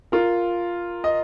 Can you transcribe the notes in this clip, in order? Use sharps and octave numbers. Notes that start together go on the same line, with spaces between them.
F4 A#4
D#5